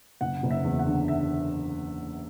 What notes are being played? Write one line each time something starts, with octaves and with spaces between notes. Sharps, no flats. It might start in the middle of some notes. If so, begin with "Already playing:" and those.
F#1 F#5
F#1
E5
E2
F#5
D3
E5